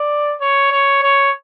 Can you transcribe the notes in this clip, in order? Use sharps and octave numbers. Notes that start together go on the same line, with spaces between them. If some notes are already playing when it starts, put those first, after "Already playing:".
Already playing: D5
C#5
C#5
C#5